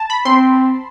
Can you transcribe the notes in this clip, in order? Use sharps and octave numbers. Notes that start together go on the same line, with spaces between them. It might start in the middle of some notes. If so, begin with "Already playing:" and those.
Already playing: A5
B5
C4 C6